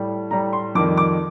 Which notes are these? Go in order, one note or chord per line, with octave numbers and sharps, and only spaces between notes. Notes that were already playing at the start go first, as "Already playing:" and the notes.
Already playing: A2 G3
A2 G3 A#5
C6
F2 D#3 G3 D6
D6